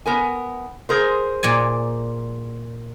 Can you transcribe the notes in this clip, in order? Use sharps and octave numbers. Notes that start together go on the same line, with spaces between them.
B3 A#4 G#5
G#4 A#4 C5
A#2 D5 G#5